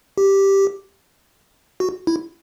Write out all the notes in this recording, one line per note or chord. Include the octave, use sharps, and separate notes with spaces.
G4
F#4
E4